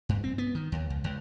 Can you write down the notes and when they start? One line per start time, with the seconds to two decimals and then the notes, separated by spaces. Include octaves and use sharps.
0.09 G2
0.24 C4
0.38 B3
0.55 D#3
0.72 D#2
0.90 C#2
1.04 C#2